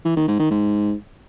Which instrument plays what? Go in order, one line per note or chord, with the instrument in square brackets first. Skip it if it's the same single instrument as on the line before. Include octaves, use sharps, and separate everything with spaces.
[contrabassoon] E3
D#3
G#2
D#3
G#2